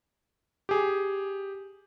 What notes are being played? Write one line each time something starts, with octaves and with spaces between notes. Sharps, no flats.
G4 G#4